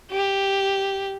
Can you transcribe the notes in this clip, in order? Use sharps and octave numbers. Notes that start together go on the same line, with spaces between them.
G4